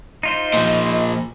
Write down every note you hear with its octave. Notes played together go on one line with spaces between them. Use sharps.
D#4 F4 C5 D#5
A#2 F3